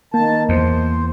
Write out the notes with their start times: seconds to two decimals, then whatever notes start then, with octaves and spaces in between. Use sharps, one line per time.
0.14 D#3 A#3 A5
0.49 E2 C5